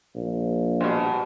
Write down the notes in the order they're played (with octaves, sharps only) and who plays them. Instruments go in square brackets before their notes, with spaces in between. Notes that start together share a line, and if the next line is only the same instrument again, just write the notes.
[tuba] A#1
[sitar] G2 B2